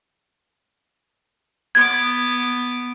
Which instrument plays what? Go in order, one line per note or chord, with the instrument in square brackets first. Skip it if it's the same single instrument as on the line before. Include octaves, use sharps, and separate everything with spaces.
[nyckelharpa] B3 D6 [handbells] G#6